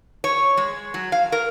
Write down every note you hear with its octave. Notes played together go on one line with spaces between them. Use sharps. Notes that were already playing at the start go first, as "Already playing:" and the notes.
C#5
G#3
F#3
F5
A#4